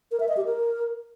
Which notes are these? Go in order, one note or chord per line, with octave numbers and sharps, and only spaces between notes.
A#4
E5
D#5
G4
A#4